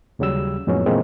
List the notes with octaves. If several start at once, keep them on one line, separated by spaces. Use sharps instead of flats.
D#2 C#3 F#3 G3 E6
F2 A2 F#3 G#3 B3 C#4
A#2 D3 E3 G#3 A#3 C4